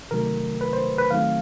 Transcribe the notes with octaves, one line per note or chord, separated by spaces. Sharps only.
C3 D#3 F#3 A3 A#4
B4
C5
B4
D#3 F#3 A3 C4 F5